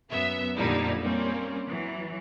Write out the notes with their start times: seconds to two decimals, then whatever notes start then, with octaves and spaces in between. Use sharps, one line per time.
0.11 F#2 B3 E5
0.55 F2 A#2 D3 G3 D#4 E4
1.01 G3 A#3 C4 C#4
1.67 E3 F#3